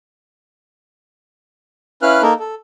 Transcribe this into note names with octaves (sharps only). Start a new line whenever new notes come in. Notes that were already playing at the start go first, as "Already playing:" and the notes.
C#4 E4 B4 F5 F6 F#6
A#3 D#4 A4 A#4
A4